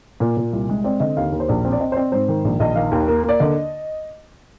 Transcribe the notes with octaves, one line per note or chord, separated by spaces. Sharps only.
A#2
A#2
C2
G#3
C4 D5
D3 D#5
D#2 F5
D#2
C5
A#1 D5
C4
D5
C4 D#5
C5
C4 D5
G#2 C5
D#3
A#1
A#1 D#5
D#3 F5
D#2
A#3
A#3
D5
D3 D#5